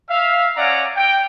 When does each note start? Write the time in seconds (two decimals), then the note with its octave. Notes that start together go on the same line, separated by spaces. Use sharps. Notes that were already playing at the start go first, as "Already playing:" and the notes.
0.10 E5 F5
0.57 C#4 D5 E5 F#5 A#5
0.97 G5